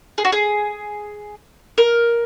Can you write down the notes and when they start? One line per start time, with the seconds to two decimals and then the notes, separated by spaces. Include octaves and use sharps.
0.18 G#4
0.25 F#4
0.32 G#4
1.78 A#4